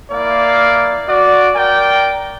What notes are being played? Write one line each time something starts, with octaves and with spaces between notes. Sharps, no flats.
A#3 E4 D5 F5
F#4 D5
A#4 D5 G5